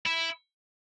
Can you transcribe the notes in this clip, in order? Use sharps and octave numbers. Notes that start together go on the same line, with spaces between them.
E4